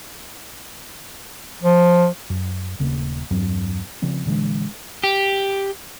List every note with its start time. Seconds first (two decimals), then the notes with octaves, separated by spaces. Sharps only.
1.62 F3
2.30 F#2
2.80 D#1 C#3 A3 A#3
3.31 E2 G2 F#3 C4
4.02 C#3 F3 C4
4.26 A#2 D3 E3 G#3
5.04 G4